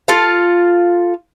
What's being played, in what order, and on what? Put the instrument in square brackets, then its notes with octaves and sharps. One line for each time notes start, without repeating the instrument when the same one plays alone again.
[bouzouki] F4 A4 F5